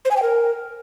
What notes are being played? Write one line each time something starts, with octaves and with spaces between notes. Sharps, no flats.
C5
G#5
G5
A#4